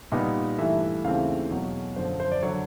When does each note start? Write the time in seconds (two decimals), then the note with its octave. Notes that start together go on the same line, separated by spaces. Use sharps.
0.12 A#2 G3 B3 D#4
0.58 G2 E3 A3 E5
1.04 D#2 C#3 E3 A3 C4 F5
1.51 E2 B2 F#3
1.96 F#2 D3 F3 C5
2.20 C5
2.32 D5
2.42 D3 F#3 C#5